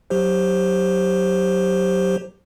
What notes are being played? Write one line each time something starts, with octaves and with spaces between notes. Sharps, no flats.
F#3 G4 C5